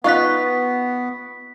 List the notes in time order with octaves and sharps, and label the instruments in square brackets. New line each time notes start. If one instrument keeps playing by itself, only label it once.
[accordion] B3 [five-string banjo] D#4 F4 [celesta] C#6 F#6 [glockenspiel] A6 B6